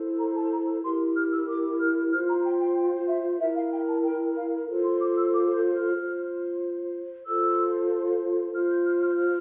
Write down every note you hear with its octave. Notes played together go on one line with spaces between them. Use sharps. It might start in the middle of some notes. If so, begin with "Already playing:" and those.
Already playing: E4 A4 C5
A#5
A5
A#5
E4 G4 A#4 C6
F6
E6
D6
F6
F4 C5 F6
A#5
G5
G5
G5
E5
E4 A#4 E5
F5
G5
A5
G5
F5
F4 A4 C5
C6
D6
E6
D6
G6
F6
F4 C5
F4 A4 C5 E6
F4 C5 F6
G6
F6
F6
G6
F6